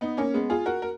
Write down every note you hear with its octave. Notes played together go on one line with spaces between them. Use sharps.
B3 D#4
A#3 C#4
G#3 B3
F4 G#4
F#4 A#4
A#4